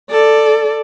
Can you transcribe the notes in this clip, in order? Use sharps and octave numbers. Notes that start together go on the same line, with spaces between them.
A4 D5